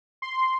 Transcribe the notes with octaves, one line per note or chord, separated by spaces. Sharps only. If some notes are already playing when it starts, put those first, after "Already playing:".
C6